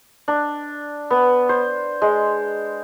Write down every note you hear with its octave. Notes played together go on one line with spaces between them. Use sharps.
D4
B3
C5
G#3